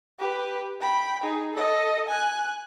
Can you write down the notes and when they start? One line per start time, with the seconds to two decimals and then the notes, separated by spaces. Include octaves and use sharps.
0.19 G4 B4
0.81 G5 B5
1.23 D#4 G#4
1.54 A4 D#5
2.08 G#5 F#6